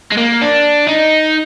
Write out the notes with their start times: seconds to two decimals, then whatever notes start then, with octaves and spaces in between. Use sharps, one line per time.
0.12 G#3
0.18 A#3
0.42 D4
0.89 D#4